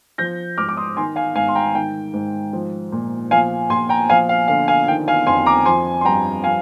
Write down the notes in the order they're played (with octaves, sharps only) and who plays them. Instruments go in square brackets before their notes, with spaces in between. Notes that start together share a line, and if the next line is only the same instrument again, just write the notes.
[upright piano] F3 G6 A#6
G#2 D6 F6
D6
C6 D#6
D#3 G#5 C6
F5 G#5
G#2 F5 G#5
C6
G5 A#5
D#3 G5
G#2
F3
A#2
F3 F5 G#5
A#2 G#5 C6
G5 A#5
F3 F5 G#5
F5
D3 F5
F5 G#5
D#3 G5
F5 G#5
F2 G#5 C6
A#5 D6
F3 G#5 C6
C6
G2 G5 A#5
F3 F5 G#5